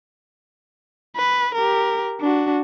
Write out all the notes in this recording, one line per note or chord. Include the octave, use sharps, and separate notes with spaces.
B4
G4 A#4
D4 F#4